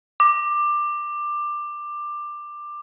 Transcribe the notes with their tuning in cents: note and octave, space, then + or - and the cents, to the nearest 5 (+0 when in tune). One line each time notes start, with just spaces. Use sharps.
D6 +15